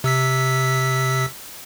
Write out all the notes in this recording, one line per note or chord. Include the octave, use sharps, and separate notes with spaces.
C3 E6 B6